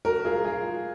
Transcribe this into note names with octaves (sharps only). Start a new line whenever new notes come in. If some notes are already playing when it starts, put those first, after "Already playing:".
F#4 A#4
F4 G#4
F4 G#4